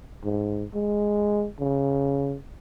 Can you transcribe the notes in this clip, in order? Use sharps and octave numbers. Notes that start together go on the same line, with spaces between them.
G#2
G#3
C#3